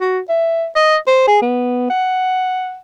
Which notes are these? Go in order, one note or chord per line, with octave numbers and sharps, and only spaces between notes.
F#4
E5
D#5
C5
G#4
B3
F#5